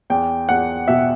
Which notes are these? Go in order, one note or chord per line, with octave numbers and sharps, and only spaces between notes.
E2 G5
E2 F#5
B2 E5